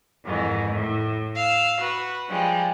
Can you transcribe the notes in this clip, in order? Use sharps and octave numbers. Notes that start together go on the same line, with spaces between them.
F2 G#2 D#3 E3
A2
F5 E6
F#4 B4 B5
F3 G3 G#3